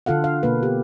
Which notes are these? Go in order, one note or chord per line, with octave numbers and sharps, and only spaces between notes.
D3 F4 A4 F5 F#5
F5
B2 A#3 B4
G4